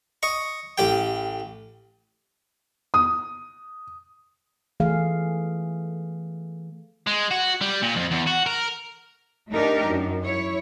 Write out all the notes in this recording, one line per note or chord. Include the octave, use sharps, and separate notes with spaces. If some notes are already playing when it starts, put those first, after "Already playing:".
D#5 C#6
A1 G4 G5
D#6
E3 A3 G#4 F5
G#3
F#4
G3
A#2
F2
E2
F#4
A#4
A3 D4 D#4 G4 A#4
F#2
E4 C#5